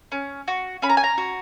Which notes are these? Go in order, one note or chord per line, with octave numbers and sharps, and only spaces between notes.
C#4
F#4
C#4 B5
A#5
G#5
A#5
F#4